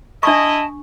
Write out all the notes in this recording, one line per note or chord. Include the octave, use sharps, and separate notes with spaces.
D4 E4 D#5 A5 C#6